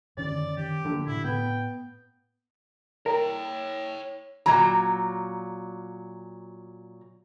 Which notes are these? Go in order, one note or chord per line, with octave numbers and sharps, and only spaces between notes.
F#2 D3 D#3 C#4 D5
D#3 G4
D3 F3 A#3
A2 C#3 E4
A2 B3 G5
A#4 C#5 G5
A#2 F#3 A#5